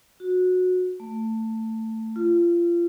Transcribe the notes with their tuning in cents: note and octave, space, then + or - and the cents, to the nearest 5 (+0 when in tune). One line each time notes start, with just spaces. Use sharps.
F#4 -15
A3 +20
F4 -25